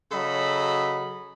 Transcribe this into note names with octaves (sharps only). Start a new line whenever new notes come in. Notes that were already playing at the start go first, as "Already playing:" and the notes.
C#3 F#3 A4 D#5 B5